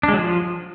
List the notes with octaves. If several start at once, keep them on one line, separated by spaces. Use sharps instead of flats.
D4
G#3
F#3
F3